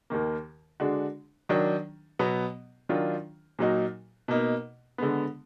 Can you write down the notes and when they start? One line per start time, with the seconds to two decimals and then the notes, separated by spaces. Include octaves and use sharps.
0.10 D#2 D#3 A#3
0.80 D3 G#3 D4 F#4
1.49 D#3 F#3 D4
2.19 B2 F#3 B3
2.89 D#3 F#3 D4 F4
3.59 A#2 F#3 A#3 D#4 F#4
4.28 B2 A#3 D#4
4.98 D3 G#3 B3